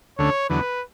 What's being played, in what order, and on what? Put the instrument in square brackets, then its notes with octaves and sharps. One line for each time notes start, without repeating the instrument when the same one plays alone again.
[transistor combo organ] D2 D3 A3 C#4 [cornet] C#5
[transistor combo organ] E2 D3 F#3 B3 [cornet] B4